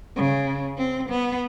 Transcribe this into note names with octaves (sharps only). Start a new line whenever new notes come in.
C#3
C4
B3